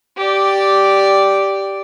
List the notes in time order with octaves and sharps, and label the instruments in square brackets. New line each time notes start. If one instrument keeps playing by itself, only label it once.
[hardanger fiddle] G4 D5